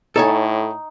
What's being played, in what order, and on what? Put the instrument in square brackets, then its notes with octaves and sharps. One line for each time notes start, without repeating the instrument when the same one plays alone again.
[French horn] A2 [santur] D#4 [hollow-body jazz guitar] A4 C#5 G#5